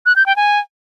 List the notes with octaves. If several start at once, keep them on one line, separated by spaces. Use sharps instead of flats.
F#6
G6
G5
G#5